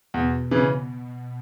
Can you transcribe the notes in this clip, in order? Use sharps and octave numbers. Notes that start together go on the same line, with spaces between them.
E2 B2
C#3 E3